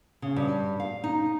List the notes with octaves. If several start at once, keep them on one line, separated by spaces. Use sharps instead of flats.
C#3
G2
F5
D#4